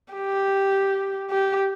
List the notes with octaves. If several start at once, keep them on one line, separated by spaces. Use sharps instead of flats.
G4
G4